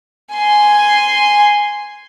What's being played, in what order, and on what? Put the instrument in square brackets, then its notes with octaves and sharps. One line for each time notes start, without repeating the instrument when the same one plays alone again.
[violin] G#5 C6